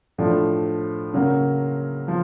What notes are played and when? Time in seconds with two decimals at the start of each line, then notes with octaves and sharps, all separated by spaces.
0.18 A2 F3 A3 D4
1.13 C#3 F#3 A#3
2.08 F3